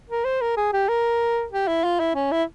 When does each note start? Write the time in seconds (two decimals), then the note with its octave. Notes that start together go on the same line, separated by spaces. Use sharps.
0.10 A#4
0.25 C5
0.41 A#4
0.57 G#4
0.73 G4
0.88 A#4
1.52 G4
1.68 E4
1.84 F4
2.00 E4
2.15 C#4
2.32 E4